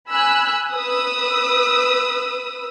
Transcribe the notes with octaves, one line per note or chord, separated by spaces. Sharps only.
G#5 B5 E6 F#6
B4 D#6 E6